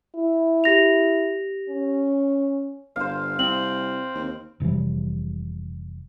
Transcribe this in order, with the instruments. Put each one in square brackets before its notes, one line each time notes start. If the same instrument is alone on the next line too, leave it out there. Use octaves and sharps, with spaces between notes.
[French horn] E4
[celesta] G4 A#6 F7
[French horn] C#4
[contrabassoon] G1 [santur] C5 F5
[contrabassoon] C2 [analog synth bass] C4 [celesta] F#7
[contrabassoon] D#2
[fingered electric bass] F1 C3 E3 G3